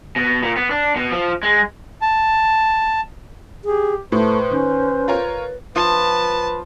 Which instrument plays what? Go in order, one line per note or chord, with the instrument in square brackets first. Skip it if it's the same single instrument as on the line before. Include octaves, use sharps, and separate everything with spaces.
[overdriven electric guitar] B2
A#2
B3
D4
B2
F3
G#3
[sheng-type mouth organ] A5
[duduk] G4 [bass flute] G#4
[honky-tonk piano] A2 [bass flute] A3 [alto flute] B4 [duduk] C5
[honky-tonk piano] D#3 [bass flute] C#4
[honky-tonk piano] F4 A#4 C#5
[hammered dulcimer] F3 [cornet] B4 [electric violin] A5